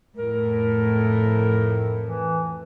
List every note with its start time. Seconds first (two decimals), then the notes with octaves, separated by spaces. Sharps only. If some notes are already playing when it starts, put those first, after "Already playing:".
0.17 F2 A2 A#4
2.01 E3